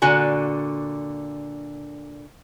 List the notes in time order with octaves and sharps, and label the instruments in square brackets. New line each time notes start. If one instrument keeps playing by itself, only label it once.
[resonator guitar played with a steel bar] A#2 D3 F#4 G#5